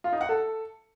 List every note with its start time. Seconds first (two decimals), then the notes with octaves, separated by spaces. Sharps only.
0.04 F4
0.12 D#4
0.21 F#5
0.29 A4